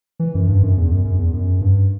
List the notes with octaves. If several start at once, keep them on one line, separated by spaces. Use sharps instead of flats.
E3
F#2
G2
F#2
E2
F#2
F#2
E2
F#2
G2